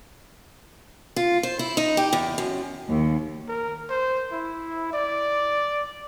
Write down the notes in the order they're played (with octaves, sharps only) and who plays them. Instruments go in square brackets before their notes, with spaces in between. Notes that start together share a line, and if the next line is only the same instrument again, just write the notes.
[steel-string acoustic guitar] F4
C5
E4
D#4
G4
E2
F#2
[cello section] D#2
[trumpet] A#4
C5
E4
D5